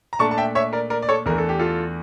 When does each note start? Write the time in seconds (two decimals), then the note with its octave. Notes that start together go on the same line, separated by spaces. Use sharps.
0.13 A#5
0.19 A#2 A3 D4 A5 C#6
0.31 A5
0.38 E5 G5
0.55 C#5 E5
0.73 A#4 D5
0.90 A#4 D5
1.02 D5
1.09 A4 C#5
1.26 E2 E3 A3 D4 A#4
1.38 A4
1.49 G4
1.59 F4 A4